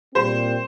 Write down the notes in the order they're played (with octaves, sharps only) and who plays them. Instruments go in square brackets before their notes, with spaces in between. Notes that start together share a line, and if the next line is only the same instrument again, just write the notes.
[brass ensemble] A#2 G3 C4 [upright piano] C5